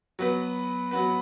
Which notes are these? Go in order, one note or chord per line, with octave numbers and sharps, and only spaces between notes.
F#3 B3 F#4 B4
F#3 B3 F#4 B4